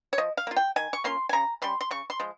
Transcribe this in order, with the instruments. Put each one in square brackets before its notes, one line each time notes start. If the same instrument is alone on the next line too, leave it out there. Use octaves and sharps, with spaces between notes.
[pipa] C#5
F3 D#5
F5
A#3 F4
G5
D#3 G#5
C#6
A#3 C#4 F4 C6
G#5
C#3 A#5
G3 C#4 C6
C6
C#3 C#6
C6
F3 G#3